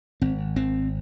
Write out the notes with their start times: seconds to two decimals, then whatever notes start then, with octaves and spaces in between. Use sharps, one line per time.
0.22 G#1 C4
0.56 G#1 C4